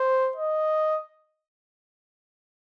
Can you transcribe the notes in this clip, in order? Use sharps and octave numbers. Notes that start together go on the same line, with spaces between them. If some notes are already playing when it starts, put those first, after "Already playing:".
Already playing: C5
D#5